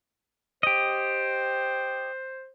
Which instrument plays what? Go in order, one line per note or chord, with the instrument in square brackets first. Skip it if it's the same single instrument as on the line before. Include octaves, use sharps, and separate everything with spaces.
[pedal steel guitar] G4 D#5 [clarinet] C5